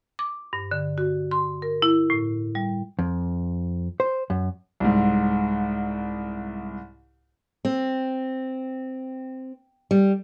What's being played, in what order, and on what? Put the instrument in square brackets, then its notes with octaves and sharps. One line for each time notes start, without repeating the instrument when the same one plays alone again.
[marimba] D6
G2
D3
F#4
C6
A#4
E4
A2
G3
[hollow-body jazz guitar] F2
C5
F#2
[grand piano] C2 G#2
[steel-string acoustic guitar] C4
G3